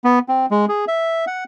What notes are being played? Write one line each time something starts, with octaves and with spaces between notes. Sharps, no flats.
B3
C4
G#3
G#4
E5
F#5